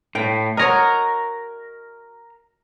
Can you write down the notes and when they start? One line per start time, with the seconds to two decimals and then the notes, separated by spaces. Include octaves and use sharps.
0.15 A2 G5
0.57 F#4 A#4 C#5 D#5 A#5